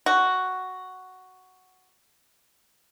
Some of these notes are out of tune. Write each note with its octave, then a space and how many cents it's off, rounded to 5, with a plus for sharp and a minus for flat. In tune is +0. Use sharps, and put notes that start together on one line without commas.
F#4 +5